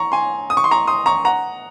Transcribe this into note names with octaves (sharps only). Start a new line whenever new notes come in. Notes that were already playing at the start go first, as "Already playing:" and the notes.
Already playing: A#5 C#6
G#5 C6
D#6
C#6
C6
A#5 C#6
C6 D#6
A#5 C#6
F#5 A#5